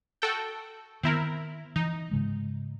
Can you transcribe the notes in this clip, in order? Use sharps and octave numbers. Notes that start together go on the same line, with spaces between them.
F#4 A4 G5
D#3 B3 C4 E4 A#4
E3 D#4
G#2 C#3 G#3